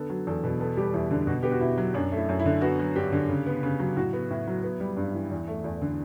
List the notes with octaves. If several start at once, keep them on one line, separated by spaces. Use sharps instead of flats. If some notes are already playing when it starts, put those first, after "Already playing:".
Already playing: D3 B3 A4
F#3
E2 A4
B2
B3 A4
G3 G4
E2 E4
D3
B2 F#4
B3 G4
F#4
B2 E4
F#3
F#2 D4
A3
E4
F#2
E4
D3
B3 F#4
F#3
G2 G4
D3
C#3
B3
C#3
F#3
A2 F#4
B3
A2 E4
F#3
B3
G3
G2
E3
E2
A3
E2
D3